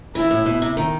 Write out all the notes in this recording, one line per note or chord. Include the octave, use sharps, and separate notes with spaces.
E3 E4
A2
B2
C3
D#3